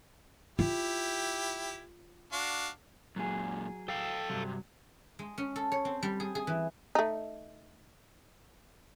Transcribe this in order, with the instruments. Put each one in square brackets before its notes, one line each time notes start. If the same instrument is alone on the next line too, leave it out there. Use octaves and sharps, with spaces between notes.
[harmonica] E4 G4 [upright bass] F4
[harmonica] D4 F#4 F5
[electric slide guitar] F#2 A#2 [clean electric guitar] F#3 G#4
[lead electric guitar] A4 F5 [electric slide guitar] G5
[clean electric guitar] G2 F#3 [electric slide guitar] C3
[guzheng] G#3
C#4
A4
C#5
C4
G3
G#4
G#4
E3
[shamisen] A3 D#4